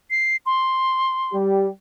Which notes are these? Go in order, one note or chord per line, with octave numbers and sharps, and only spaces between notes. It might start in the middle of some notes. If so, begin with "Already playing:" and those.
C7
C6
G3 G4